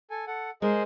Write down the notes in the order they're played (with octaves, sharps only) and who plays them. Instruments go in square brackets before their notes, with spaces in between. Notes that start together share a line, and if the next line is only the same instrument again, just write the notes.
[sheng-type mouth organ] A4 G#5
A4 F#5
[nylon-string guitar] G#3 A#4 [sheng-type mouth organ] G#4 C5 D#5